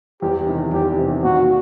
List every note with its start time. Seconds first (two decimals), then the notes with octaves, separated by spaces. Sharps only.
0.22 E2 G4
0.47 C3 D#3
0.72 E2 G4
0.98 C3 D#3
1.23 A#2 F#4